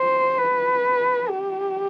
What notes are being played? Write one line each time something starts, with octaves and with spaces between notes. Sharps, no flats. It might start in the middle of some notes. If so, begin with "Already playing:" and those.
Already playing: C5
B4
G4